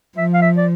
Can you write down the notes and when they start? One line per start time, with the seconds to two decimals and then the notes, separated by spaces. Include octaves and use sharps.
0.18 F3 E5
0.34 F5
0.42 E5
0.57 D5